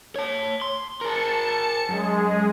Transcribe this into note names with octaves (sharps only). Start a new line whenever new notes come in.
C#5 A5
C6
G#4 A#4 A5 C#7
F#2 G#3 G#4